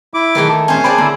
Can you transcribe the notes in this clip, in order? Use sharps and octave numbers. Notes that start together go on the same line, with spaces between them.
E4 D6
B1 D#3 E3 A3 G#4
A4
E2 A#2 A3 C#4 C5 G#5
D4 G#4 C5 D5 G5 B5
D3 A#3 E4